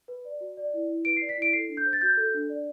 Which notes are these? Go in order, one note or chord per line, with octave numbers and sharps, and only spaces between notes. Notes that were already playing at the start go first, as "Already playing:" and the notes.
B4
D5
F#4
D5
E4
E4
B4 D7
C7
D5
B6
E4 D7
A4 C7
D4
G6
C5
A6
F#4 G6
A4
D4
D5